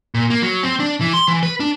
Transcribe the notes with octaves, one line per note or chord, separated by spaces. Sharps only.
A#2
A#3
F#3
C4
D4
E3
C6
E3
B4
D4